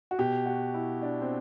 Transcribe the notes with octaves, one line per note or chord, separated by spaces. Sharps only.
F#4
B2 G4
F#4
E4
D4
C4